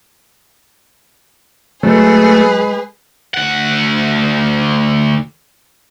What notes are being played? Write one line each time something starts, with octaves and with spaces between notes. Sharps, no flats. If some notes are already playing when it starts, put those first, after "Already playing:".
F#3 G#3 A3 G#4 B4
D2 F#5